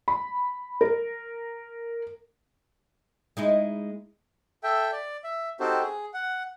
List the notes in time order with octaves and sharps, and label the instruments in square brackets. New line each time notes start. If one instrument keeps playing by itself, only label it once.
[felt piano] B5
A#4
[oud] G#3 D#4 E4
[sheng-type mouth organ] A4 E5 G5
D5
E5
C4 D#4 F#4 G4 A4 C5
G#4
F#5